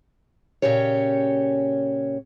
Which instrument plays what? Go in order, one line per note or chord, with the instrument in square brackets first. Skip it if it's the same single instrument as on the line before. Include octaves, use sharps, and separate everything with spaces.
[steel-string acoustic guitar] A#2 C#3 C#4 G4 C#5